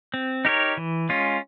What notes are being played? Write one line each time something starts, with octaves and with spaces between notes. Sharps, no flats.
C4
D#4 G4 A#4 C#5
E3
G#3 C#4 F4